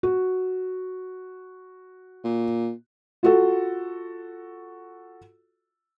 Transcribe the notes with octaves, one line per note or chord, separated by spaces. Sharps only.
F#4
A#2
F4 F#4 A4